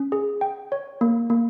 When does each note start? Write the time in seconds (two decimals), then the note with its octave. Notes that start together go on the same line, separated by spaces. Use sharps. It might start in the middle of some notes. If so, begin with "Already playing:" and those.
Already playing: C#4
0.12 G#4
0.41 G5
0.72 C#5
1.01 A#3
1.30 A#3